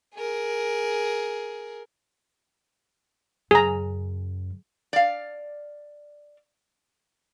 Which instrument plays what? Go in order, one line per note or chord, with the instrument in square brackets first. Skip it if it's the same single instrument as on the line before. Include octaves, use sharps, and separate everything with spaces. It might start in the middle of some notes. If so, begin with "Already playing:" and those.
[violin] G#4 A#4
[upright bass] F#2 C#3 [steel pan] G#4 A#5
[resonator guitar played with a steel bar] D5 F5